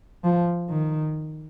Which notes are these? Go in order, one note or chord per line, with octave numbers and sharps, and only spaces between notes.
F3
D#3